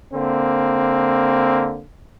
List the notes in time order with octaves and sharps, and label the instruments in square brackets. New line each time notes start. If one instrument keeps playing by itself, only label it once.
[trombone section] D3 A#3 C4